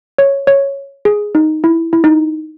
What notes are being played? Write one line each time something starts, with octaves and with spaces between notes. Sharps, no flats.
C#5
C#5
G#4
D#4
E4
E4
D#4